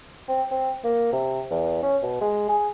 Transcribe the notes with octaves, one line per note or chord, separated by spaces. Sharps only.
C4
C4
A#3
C3
E2
C#4
B2
G#3
G#4